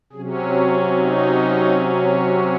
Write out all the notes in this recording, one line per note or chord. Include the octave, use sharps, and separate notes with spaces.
C3 F#3 C#4 G#4
F#4
F#4
D#4